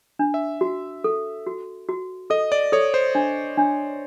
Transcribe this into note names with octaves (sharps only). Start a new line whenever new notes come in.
D4
E5
F#4
A4
F#4
F#4
A4 D#5
D5
A4 C#5
C5
D4
D4